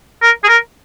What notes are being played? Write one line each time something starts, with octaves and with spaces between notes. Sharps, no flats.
A#4
G#4
A#4